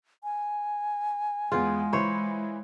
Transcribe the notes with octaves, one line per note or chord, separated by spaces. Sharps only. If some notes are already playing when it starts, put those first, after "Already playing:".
G#5
E2 E3 G#3 F4 G#4
E3 E4 C5 C#5 B5